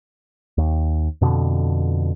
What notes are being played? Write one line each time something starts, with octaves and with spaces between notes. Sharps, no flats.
D#2
F2 B2 D3